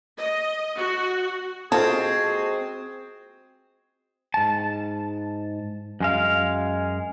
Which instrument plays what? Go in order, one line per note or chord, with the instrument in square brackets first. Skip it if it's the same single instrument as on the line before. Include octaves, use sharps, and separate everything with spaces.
[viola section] D#5
F#4
[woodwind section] G#3 F#4 G#4 [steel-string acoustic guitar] C4 [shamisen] F4 A4
[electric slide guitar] G#2 A5
F#2 G#3 F5